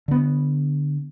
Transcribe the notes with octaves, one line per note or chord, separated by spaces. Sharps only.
D3 B3